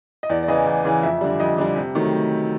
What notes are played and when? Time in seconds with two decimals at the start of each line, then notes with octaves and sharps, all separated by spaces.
0.23 D#5
0.29 E2 D5
0.43 D5
0.48 C#3 E3 D#5
0.66 E2
0.85 C#3 E3
1.03 F2 E5
1.21 D3 G3
1.40 F2 D#5
1.58 D3 G3
1.76 C3
1.95 D#3 F#3 A3